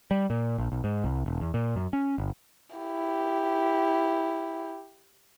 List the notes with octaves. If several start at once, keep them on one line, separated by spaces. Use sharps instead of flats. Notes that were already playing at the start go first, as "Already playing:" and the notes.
G3
A#2
A#1
B1
G#2
C2
E1
E2
A#2
F#2
C#4
G1
E4 G4